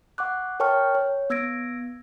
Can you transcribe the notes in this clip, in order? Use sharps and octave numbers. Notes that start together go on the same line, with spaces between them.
F#5 C#6 D6 F#6
A#4 C#5 G5 A5 C#6 F6
C#5
B3 E6 G#6 A#6 D7